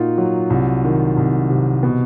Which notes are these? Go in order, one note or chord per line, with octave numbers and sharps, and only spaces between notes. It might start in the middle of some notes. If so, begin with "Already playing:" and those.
Already playing: A#2 A#3 D#4 F4 F#4
F#3
C2
D#3
C2
C3
B2